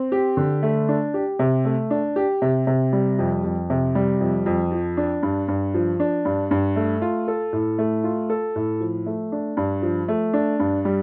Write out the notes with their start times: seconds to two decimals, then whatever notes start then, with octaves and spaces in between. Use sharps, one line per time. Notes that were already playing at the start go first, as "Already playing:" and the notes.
Already playing: C4
0.12 G4
0.37 D3
0.63 A3
0.89 D4
1.14 G4
1.39 C3
1.65 A3
1.91 D4
2.16 G4
2.42 C3
2.67 C3
2.93 G3
3.19 F2
3.44 F2
3.70 C3
3.95 G3
4.21 F2
4.46 F2
4.71 F3
4.97 D4
5.23 G2
5.48 G2
5.74 F3
6.00 D4
6.25 G2
6.51 G2
6.76 A3
7.02 F4
7.28 A4
7.53 A2
7.78 A3
8.04 F4
8.30 A4
8.56 A2
8.80 F3
9.06 A3
9.32 D4
9.57 G2
9.82 F3
10.08 A3
10.34 D4
10.60 G2
10.85 G3